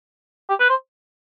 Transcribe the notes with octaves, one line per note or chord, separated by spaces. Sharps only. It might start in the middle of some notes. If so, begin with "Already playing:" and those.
G4
B4
C5